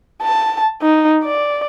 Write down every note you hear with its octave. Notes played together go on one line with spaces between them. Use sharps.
A5
D#4
D5